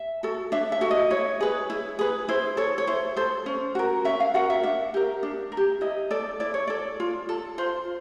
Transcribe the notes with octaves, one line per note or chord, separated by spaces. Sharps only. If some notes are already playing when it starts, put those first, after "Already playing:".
Already playing: E5
F#4 A4
D4 E5
E5
F#4 A4
D#5
E4 C#5
G#4 B4
E4
G#4 B4
E4 C5
A4 C#5
C#5
E4 C5
A4 C5
C#4
F#4 A#4
C#4 E5
F5
F#4 A#4 F#5
E5
D4 E5
G4 A#4
D4
A#4
G4
E4 D#5
A4 D5
E4 D5
C#5
A4 D5
F4
A4
F4 C5